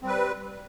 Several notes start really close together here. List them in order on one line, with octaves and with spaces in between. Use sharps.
C4 G3 B4